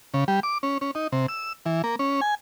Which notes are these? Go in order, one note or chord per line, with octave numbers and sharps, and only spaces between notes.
C#3
G3
D6
C#4
C#4
D#4
C3
E6
E3
A#3
C#4
G#5